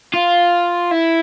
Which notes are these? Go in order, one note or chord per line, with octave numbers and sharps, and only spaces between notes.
F4
E4